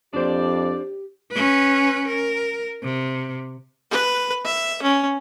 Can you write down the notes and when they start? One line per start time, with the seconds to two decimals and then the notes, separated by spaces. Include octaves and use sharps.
0.14 F2 D4 G4 C5 D5
1.32 C#4 B4
2.08 A#4
2.83 C3
3.91 B4
4.45 E5
4.82 C#4